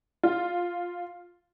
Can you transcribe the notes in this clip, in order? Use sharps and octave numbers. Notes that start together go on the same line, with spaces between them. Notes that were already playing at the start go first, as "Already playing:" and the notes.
F4